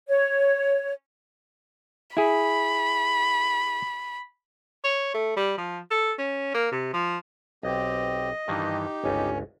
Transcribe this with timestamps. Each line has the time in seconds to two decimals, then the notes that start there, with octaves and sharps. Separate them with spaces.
0.08 C#5
2.17 E4 G#4 B5
4.84 C#5
5.14 A3
5.36 G3
5.58 F3
5.91 A4
6.19 C#4
6.54 A#3
6.72 C3
6.94 F3
7.63 B1 C4 G4 D#5
8.48 G2 D#3 E3 D#4 G4
9.04 G1 C#2 C#4